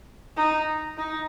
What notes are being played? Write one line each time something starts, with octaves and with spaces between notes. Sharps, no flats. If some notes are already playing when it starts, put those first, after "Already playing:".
D#4
D#4